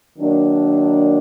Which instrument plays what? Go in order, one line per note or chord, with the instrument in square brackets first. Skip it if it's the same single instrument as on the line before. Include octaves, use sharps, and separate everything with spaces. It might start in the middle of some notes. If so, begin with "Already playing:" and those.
[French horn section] D#3 F#3 A#3 D4